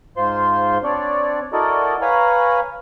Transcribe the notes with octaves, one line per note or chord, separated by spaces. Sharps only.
G#2 F4 C5 C6
C4 D4 C#5 D5
E4 F#4 A4 A#4 D5 D#5
B4 C#5 F5 G#5 A#5 B5